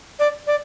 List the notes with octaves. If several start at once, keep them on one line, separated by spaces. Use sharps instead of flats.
D5
D5